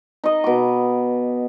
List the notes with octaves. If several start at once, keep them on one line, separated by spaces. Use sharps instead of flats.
D#4 D#5
B2 D6